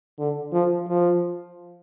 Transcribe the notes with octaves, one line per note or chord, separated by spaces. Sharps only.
D3
F3
F3